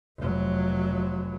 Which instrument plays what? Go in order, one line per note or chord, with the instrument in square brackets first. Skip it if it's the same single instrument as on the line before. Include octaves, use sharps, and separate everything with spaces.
[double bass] F1 F#3